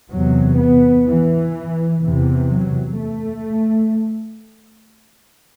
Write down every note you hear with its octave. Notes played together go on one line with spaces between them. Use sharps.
E2 C3 F#3
B3
E3
E2 C3 E3
F#3
A3